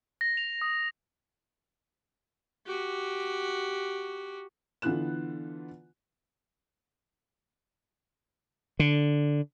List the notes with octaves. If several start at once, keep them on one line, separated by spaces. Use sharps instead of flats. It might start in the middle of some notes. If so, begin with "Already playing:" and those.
A#6
F7
D#6
F#4 G4
D3 E3 B3 F4 F#6 E7
D3